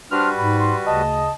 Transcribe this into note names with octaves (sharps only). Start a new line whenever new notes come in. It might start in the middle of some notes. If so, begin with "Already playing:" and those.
G3 D4 F#4 B4 C5 C6 F6
G#2 B5
C6
D2 C#3 D#5 A5